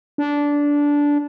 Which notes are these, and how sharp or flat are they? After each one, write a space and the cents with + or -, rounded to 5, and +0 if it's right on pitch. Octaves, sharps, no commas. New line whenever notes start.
D4 -15